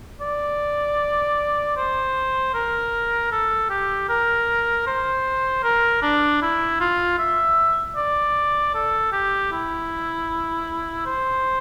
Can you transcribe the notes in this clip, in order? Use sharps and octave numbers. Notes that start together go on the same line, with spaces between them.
D5
C5
A#4
A4
G4
A#4
C5
A#4
D4
E4
F4
E5
D5
A4
G4
E4
C5